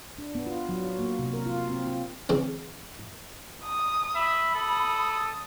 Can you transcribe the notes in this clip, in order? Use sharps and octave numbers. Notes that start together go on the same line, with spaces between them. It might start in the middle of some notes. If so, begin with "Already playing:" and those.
D4
B3
F4
F#3
F#4
A#3
C3
A#4
F4
C4
F4
C#3 E3 C4
D#6
E5 B5
A4 D#6